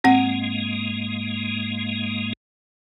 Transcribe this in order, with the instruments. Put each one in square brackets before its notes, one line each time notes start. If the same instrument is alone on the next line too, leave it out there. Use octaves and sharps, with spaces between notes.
[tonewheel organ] G#2 G#3 A#3 [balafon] C4 F#5